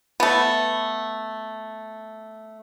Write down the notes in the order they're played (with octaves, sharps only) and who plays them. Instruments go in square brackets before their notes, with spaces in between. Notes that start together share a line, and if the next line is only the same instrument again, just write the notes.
[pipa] A3 B3